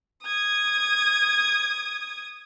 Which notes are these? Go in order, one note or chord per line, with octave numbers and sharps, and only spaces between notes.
D#6 G#6